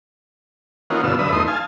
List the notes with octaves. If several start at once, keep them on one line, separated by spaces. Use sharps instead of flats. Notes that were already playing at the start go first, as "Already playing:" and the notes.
E3 A#3 C#4 D#4 F4 F#4
G2 B2 D3 F4 E6
F#2 D3 B4 E5 D#6
E2 A3 D#4 C6 D#6
F5 G#5 A5